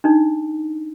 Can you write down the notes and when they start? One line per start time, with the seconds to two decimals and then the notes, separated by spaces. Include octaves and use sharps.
0.04 D4 D#4